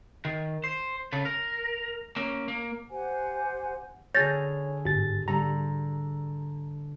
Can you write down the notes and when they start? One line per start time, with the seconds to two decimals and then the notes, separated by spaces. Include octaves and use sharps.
0.25 D#3
0.64 C5
1.13 C#3 A4
1.25 A#4
2.16 A#3 C#4
2.48 A#3
2.90 G4 C5 F#5 G#5
4.15 D3 G#4 C#5 F6 G6 A6 A#6
4.85 G1 G#2 A6
5.28 D3 G3 A#5